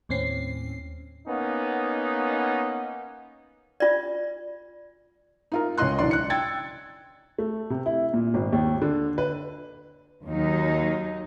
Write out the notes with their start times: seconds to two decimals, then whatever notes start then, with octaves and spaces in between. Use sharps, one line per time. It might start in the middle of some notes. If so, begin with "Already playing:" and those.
0.09 D#2 A2 C4 C#4 C7
1.27 A#3 B3 C#4 D#4
3.80 F4 D5
5.52 D#4 F4 A#4
5.78 C#2 C#4 F4 D#5 C6 F#6
5.99 B1 E3 D4 D5 C6
6.11 F#6 C#7
6.30 G5 E6 G#6 A6
7.38 A3
7.70 C3
7.86 E4
8.14 A#2
8.34 G#1
8.52 D#2
8.82 D3
9.18 B4
10.25 D#2 F#3 D#4